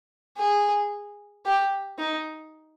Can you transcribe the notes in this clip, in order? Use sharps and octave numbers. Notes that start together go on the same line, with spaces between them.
G#4
G4
D#4